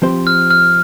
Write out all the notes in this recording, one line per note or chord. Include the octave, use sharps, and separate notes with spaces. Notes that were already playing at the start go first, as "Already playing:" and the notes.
F3 C4 G4 C5
F6
F6